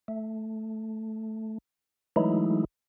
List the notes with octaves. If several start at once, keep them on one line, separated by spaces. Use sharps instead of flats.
A3
E3 F#3 G#3 A3 D#4 E4